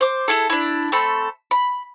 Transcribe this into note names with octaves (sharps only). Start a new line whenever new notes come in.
C5 D6
E4 G#4 A4
D4 E4
A3 C4 A4 B5
B5